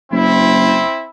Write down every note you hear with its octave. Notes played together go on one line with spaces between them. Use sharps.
F#1 C4 E4